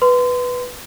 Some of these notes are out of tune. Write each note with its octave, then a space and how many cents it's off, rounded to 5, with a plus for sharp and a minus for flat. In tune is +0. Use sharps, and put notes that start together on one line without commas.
B4 +0 C6 -30